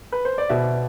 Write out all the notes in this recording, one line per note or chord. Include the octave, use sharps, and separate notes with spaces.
B4
C5
D5
B2 E5